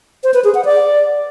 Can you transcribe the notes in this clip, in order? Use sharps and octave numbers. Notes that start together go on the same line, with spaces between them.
C5
B4
G#4
F#5
D5